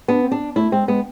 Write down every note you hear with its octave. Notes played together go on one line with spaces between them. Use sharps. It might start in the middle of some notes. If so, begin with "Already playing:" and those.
B3 D4
C4
D4
A3 E4
G#3 C4
G#3 B3